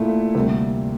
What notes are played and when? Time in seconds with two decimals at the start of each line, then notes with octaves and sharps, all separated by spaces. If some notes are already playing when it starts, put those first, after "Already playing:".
Already playing: A#2 A3 E4 A4
0.35 D2 C3 G3 A#3